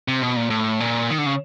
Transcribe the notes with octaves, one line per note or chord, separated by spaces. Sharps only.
C3
B2
A#2
A2
A#2
D#3
D3
C#3